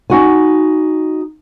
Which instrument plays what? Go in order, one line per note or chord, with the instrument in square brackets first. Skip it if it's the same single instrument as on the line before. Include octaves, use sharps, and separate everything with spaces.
[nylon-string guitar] D#4 F#4 G#5